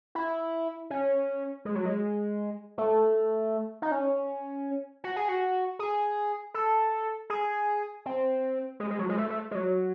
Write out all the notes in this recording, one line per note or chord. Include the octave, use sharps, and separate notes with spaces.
E4
C#4
G#3
F#3
G#3
A3
D#4
C#4
F#4
G#4
F#4
G#4
A4
G#4
C4
G#3
G#3
F#3
G#3
A3
A3
G#3
F#3